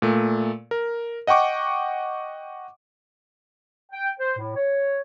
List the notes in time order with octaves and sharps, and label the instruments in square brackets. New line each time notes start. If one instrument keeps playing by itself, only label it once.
[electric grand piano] A#2 A3
A#4
D#5 F#5 G5 C#6 D6
[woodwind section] G5
C5
A2
C#5